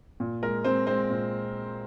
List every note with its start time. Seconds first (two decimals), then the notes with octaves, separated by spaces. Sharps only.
0.20 A#2
0.42 G#3 A#4
0.64 G#3 C4 C5
0.87 G#3 C4 C5
1.10 A#2